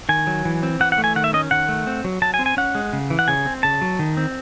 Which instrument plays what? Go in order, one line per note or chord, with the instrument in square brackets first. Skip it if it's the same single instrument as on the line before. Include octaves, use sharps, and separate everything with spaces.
[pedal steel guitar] D#3 G#5
F#3
E3
C4
E3 F#5
F#5
A3
G#5
D#3 F#5
E5
C#4 D#5
D#3 F#5
A3
C4
F#3
F#3 A5
G#5
C4
G#5
C#4 F#5
G#3
C#3
E3
F#5
C#3 G#5
C4
C#3 A5
F#3
D#3
C4